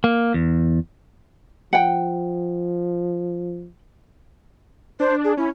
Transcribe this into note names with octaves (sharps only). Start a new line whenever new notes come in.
A#3
E2
F3 F#5 G5
D4 C5
G#4
C#4 E4